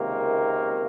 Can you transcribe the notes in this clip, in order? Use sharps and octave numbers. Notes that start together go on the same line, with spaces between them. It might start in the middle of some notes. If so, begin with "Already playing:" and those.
Already playing: C#2 C3 D#3 A#3